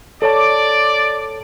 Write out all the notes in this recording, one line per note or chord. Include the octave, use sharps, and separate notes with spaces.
A4 C#5 D5 A5 D6